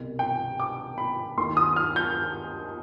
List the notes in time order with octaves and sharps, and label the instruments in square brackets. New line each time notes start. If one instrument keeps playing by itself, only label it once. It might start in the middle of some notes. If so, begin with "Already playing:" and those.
Already playing: [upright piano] C2 B2
G5
D6
B5
D#2 D#3 C6
D#6
F6
G6